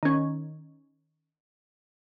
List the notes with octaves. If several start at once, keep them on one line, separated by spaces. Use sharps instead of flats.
D#3 C#4